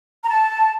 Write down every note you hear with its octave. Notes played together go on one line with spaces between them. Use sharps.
A#5
A5